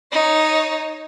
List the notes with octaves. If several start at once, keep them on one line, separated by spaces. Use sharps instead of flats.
D#4 C#5